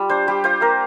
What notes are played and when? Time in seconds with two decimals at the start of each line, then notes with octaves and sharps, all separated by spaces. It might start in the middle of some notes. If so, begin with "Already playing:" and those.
Already playing: G3 F4
0.09 D4 C5
0.27 G3 G4
0.44 F4 C5
0.61 A#3 A#4